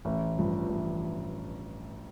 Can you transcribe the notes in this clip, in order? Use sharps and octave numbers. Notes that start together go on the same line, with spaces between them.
A1
G2 F3
A1